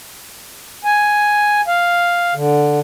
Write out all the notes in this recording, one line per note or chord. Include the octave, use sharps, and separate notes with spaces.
G#5
F5
D3